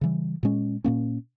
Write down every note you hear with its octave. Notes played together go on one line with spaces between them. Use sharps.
C#3 E3 G3
A#2 G#3 C#4
A#2 A#3 C#4